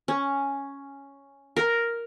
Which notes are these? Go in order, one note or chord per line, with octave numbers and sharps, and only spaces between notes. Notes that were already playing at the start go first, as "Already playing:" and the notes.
C#4
A#4